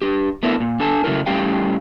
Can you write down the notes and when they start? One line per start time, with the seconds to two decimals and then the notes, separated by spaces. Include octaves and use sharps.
0.02 D4 G4
0.43 A3 B3 D4 E4 A#4
0.60 A#2
0.80 D4 A4 G#5 A5
1.04 C#3 F#3 A3 E4 A#4
1.26 A2 G3 C#4 G4 F5 G5